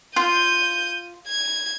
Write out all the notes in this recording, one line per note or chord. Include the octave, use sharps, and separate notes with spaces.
F4 G6 D#7
G#6